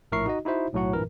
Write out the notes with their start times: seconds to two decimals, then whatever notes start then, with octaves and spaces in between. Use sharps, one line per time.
0.12 A#1 A2 A#4 E5 C#6 C7
0.26 D#4 F#4 D#5
0.45 D#4 E4 F#4 C5 E5
0.73 B1 A2 F#3 F#4 F#5
0.93 G2 A#2 E3 A#4